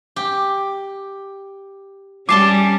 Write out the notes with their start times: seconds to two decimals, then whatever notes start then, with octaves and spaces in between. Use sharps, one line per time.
0.16 G4
2.29 G3 C#4 G#5 A5 C6 D6 C7